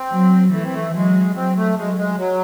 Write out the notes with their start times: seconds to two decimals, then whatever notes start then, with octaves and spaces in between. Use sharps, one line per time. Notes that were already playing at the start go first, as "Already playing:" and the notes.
Already playing: C4
0.12 F#3
0.53 E3 A3
0.64 C4
0.74 A3
0.94 F#3 G#3
1.35 F#3 C4
1.57 A3
1.77 F#3 G#3
1.97 G#3
2.17 F#3